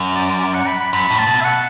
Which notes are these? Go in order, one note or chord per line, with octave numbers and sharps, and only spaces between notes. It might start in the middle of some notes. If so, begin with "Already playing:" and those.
Already playing: F#2
D5
D5
F#5
B5
B5
F#2 B5
A2
A5
B2
E5
F#5